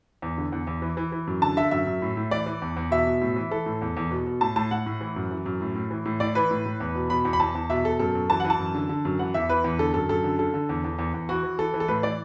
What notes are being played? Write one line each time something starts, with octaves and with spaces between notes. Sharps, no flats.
E2
D3
E2
E2
E3
E3
E3
F#2
D3 A5
D3 E5
F#2 E5
F#2
A2
A2
E3 D5
E3
E2
E2
B2 E5
B2
A2
E3
E3 A4
A2
E2
E2
B2
B2
A2 A5
A2 A5
A2 F#5
A2
E3
F#2
E3
F#2
A2
A2
E3
A2
A2 D5
E3 B4
A2
A2
E2
B2
B2 B5
E2
B5
E2 A5
E2
B2 E5
B2 A4
F#2 A4
F#2
E3 A5
E3 F#5
A5
F#2
D3
D3
F#2
E3 F#5
E2 E5
E3 B4
E2
D3 A4
F#2 A4
F#2 A4
D3
D3 A4
D3
E2
E2
E2
E2
E3 F#4
E3
E3 A4
E3
A4
A2 B4
E3 D5